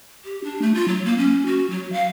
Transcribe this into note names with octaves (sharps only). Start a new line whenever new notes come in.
G4
D4
A3
F4
F#3
A#3
C#4
F#4
F#3
F5